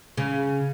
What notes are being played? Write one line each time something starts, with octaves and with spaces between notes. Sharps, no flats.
C#3